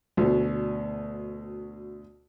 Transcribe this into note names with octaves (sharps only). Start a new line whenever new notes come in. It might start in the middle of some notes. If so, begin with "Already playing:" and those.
D2 B2